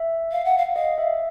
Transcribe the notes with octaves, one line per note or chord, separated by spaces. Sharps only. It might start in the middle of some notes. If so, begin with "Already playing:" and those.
Already playing: E5
F5
F#5
F5
D#5 F5
E5